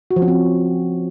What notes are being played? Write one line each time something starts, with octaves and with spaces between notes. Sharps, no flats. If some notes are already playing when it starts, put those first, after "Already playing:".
F#4
F3
C#4
C4